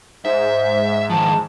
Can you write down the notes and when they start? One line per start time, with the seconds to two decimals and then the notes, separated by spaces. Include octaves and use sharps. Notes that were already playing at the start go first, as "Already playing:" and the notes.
0.25 G#2 C5 E5
1.10 D#3 F3 A5